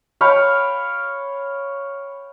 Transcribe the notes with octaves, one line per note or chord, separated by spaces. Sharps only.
C#5 F5 G5 B5